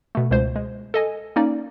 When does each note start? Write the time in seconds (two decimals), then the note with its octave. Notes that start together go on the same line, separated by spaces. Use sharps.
0.15 B2 A3
0.31 C#2 B2 G#3 C5
0.56 G#3
0.94 A4 D#5 G#5
1.36 A#3 C#4 D#4 D5